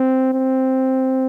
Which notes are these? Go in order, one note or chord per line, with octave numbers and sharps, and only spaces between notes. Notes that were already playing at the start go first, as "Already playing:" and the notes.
Already playing: C4
C4